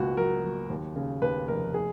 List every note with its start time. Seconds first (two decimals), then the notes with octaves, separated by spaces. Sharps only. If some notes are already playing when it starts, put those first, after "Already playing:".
Already playing: C#2 B2 F#4
0.17 F#3 A#4
0.44 F#3
0.70 D#2
0.96 C#3
1.22 D#2 B4
1.48 F1 A#4
1.74 G#4